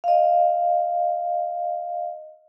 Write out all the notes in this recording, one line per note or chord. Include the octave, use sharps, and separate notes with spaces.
D#5 F5